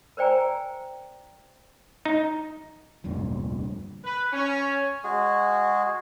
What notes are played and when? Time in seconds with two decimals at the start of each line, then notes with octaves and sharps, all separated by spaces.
0.17 A#4 C5 D5 G5 G#5 A#5
2.05 D#4
3.04 F1 D2 G2 A#2
4.03 B4
4.32 C#4
5.04 G#3 F#4 G#4